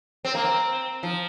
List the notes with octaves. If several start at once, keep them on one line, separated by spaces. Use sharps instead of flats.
C4
A#3
C4
F3